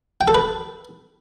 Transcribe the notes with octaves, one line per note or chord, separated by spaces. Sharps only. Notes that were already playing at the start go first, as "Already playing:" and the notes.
G5
A4
B4